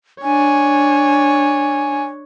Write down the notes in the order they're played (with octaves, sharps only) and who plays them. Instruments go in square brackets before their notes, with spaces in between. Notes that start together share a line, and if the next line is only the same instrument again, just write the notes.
[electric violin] D4 C#5 [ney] G#5